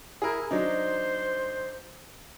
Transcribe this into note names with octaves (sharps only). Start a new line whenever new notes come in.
E4 G#4 A#4
F#3 D4 D#4 C5